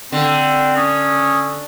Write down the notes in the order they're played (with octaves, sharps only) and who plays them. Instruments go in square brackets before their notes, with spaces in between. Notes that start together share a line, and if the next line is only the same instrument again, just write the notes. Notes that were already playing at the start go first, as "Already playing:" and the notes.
[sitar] D3 [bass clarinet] C4
[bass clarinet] C#4 [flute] D#6